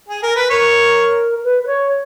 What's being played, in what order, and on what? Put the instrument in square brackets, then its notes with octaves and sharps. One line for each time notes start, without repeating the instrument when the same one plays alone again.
[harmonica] G#4
A#4
B4
[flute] A#4 [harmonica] C#5
[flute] B4
B4
C#5